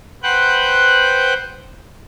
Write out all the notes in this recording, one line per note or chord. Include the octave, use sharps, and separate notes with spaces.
B4 C5 F#5 G5 F#6 G6